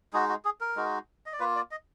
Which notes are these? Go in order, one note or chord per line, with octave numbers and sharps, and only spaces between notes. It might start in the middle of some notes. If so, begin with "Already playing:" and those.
G#3 D#4 F#4 G#4
F#4
G#4
A#4
G#3 D#4 F#4
D#5
D5
A#3 F4 B4
D5
D#5